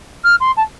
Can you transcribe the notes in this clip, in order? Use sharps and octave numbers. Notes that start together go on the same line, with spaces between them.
F6
C6
A5